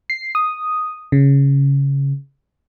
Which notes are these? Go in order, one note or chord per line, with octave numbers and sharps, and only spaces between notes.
C7
D#6
C#3